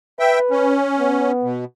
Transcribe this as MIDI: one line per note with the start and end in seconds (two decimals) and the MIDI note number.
0.19 0.75 71
0.19 0.39 76
0.19 0.39 79
0.51 1.32 61
0.99 1.53 59
1.43 1.65 47